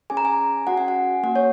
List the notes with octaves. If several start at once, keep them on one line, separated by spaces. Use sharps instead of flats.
C#4 G#4 G#5
A#5
G#5
C#4 F#4 F#5
G#5
F#5
A#3 F#4 F#5
C#5